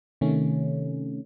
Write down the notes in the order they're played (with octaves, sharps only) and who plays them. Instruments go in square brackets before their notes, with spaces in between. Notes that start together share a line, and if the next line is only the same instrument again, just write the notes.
[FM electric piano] C3 D#3 A3 C#4